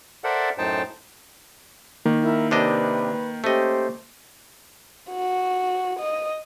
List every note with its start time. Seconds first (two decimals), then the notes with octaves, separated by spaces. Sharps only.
0.24 A4 A#4 C5 D5 E5 F#5
0.58 F#2 A2 D#4 C5 G5 A5
2.06 D#3 A#3
2.22 E4 A#4
2.51 C3 D4 B4 D#5
3.44 A3 C#4 G4 C5 D#5
5.11 F#4
5.99 D#5